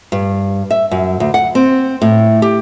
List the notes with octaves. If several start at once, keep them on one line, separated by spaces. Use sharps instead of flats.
G2
E5
F#2
D2
F#5
C4
A2
G4